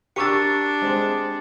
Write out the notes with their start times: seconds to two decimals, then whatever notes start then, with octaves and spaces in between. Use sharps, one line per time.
0.16 D4 G4 A#4 C#6 E6 A6 C#7
0.82 G#3 C4